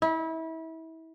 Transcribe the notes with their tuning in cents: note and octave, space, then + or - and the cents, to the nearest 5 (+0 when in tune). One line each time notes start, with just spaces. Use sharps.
E4 -30